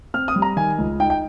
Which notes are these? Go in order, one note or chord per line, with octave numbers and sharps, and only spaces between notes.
C4 F6
D#6
G3
A#5
D#3 G#5
C#2
D#4 G5
G5